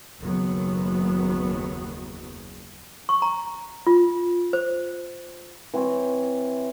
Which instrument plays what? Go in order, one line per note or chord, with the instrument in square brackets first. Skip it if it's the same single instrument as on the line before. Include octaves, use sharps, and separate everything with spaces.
[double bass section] F#1 D#2 F#3 B3
[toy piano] C#6
A#5
F4
C5
[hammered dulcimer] E3 C4 C#5